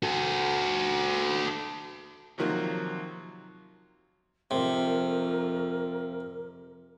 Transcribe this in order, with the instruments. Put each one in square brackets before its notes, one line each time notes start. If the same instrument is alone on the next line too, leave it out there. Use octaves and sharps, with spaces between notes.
[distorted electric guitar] F#4 A4
[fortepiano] C3 D#3 F3 F#3 A#3
[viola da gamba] F2 [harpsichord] C3 [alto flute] A#4